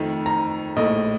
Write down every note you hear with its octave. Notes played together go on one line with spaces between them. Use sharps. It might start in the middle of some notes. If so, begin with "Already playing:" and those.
Already playing: F2 D#3 A3
A#5
A#1 A2 A3 D#5